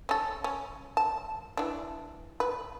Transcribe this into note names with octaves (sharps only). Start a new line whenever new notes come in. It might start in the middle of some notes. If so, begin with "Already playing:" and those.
C#4 A4
C#4
A5
E3 D4
B4